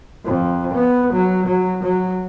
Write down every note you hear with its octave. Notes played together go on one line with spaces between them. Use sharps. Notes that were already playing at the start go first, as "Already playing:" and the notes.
F2
B3
F#3
F#3
F#3